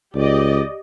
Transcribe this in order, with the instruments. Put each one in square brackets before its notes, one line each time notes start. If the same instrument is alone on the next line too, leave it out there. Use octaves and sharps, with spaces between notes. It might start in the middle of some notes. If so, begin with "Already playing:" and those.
[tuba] C#2 [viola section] G4 D5 D#5